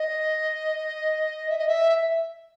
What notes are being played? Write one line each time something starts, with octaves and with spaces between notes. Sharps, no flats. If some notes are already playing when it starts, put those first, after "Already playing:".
Already playing: D#5
E5
D#5
E5